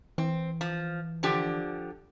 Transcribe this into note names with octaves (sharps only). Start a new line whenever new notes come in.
E3 C4
F3
D3 F3 G4